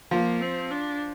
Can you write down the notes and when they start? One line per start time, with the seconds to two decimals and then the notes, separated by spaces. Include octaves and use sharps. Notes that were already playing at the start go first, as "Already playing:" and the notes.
0.11 F3 A#3
0.41 C4
0.71 D4